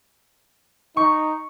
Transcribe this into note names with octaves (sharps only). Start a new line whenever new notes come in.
D#4 C#6